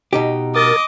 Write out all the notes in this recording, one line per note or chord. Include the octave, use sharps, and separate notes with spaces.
B2 D#4 G4
A#4 D#5 D6 A6